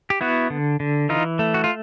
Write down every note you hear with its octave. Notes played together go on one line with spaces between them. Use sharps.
G4
B3 E4 F#4
D3
D3
E3 D#4 F4
A3
F#4
F4